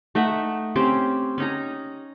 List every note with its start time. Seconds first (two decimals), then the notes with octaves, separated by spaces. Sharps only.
0.15 A3 D#4 E5 F#5
0.75 C4 C#4 G4 C5
1.38 C#4 D#4 A#5